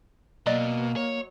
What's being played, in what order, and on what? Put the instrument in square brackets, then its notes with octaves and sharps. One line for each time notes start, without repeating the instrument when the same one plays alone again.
[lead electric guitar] B2 [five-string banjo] F#3 D5 D#5 [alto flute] A#3
[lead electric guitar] C#5